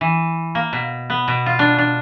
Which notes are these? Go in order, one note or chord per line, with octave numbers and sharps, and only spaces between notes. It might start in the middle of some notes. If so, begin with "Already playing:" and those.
E3
A#3
B2
B3
B2
F4
D4
D4